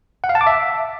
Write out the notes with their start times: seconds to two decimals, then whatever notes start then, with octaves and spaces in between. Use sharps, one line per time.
0.24 F#5
0.29 F5
0.35 A5
0.41 D6
0.47 E5